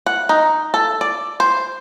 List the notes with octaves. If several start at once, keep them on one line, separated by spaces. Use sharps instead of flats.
F#5
D#4
A4
D5
C5